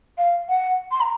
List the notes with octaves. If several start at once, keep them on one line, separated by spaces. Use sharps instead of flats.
F5
F#5
C6
A#5